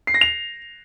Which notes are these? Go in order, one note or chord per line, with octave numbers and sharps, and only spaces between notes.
C7
A#6
F7